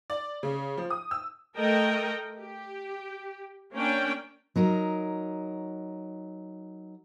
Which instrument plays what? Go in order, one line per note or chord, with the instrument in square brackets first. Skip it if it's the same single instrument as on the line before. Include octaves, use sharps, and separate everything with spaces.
[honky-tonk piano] D5
C#3
F3
D#6
E6
[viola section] A3 A4 A#4 D#5 G5
G4
A#3 C#4 D4 G5
[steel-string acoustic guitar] F#3 D#4 A#4